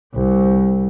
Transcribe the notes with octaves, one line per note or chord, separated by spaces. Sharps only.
C2